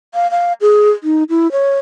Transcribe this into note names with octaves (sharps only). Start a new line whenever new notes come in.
F5
F5
G#4
D#4
E4
C#5